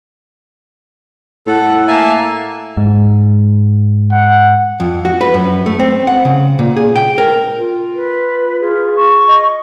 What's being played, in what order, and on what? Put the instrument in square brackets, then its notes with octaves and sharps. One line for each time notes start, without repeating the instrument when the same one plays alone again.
[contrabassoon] A2 [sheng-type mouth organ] A4 [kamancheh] F#5
[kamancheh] A#3 [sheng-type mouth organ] E5 G#5 A5
[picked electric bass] G#2
[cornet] F#5
[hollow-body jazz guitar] F2
F#4
B4
F#2
A3
C4
F#5
C#3
A#2
G#4
G5
A#4
[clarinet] F4
[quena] B4
[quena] F4 [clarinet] G#4
[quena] C#6
[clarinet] D#5